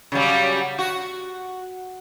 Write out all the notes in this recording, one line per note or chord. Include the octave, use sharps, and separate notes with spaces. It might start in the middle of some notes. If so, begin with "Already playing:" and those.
C#3 F#3 G3
F#4